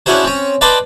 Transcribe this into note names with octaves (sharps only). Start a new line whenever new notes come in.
C#4 D4 E4 F#4 G#4 C5
C4 C#4
B4 D5 D#5 G5 A5 C6